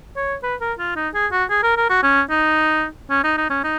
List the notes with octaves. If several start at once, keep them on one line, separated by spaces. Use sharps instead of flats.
C#5
B4
A#4
F4
D#4
G#4
F#4
G#4
A#4
A#4
F#4
C#4
D#4
C#4
D#4
D#4
C#4
D#4